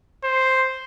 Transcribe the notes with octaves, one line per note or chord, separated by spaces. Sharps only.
C5